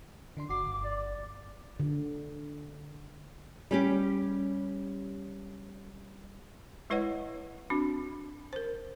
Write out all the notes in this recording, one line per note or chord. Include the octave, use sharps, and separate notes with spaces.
D3 D4 C6
G1 F#4 D6 C7
G1
D5
D3
G3 C#4 G4
G#3 E4 B4 C#5 D#5 F#5
C4 D4 F#4
A#4 C5